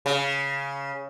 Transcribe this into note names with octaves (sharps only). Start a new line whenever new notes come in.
C#3